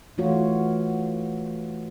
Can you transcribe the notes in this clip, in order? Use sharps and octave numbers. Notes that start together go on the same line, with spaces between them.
E3 A3 F4 F#4 C#5